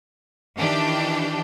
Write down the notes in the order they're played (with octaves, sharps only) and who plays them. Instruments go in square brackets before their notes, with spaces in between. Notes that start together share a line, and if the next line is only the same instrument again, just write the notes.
[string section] D#3 E3 D4 G4